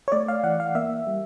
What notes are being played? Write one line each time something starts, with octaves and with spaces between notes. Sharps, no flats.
C#5
A3 D5
F5
E3 F#5
F5
A#3 E5
G3